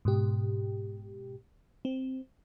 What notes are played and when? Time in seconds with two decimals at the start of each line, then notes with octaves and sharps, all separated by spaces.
0.05 G#2 B2 G4
1.85 C4